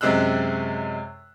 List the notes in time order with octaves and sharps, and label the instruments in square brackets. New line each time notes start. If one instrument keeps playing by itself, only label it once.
[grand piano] F#2 C3 G#3 E6 F#6